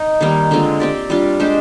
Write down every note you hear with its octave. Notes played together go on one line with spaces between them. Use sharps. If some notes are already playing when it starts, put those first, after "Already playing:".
Already playing: D#4
D#3 G3 A#3
D3 G#3 C4 F4
C4 G4 D5
G3 D4 F4
G#3 D4 G4 C5